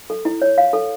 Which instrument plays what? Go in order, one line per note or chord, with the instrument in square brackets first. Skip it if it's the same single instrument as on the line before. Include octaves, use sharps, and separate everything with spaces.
[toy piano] A4
E4
C#5
F5
A4